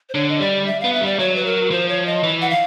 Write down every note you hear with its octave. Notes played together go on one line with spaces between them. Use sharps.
C5
D3 C#5
D#5
G3 D5
E5
B3 F5
E5
G3 D5
F#3 C#5
B4
A#4
F3 C5
C#5
D#5
E3
F#5
F5